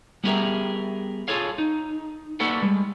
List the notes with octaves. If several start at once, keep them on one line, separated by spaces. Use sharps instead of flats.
G3 B3 G4 G#4 A#4 E5
F4 G#4 A4 C#5 F5
D#4
A#3 F#4 A4 B4 D5 F#5
G3 G#3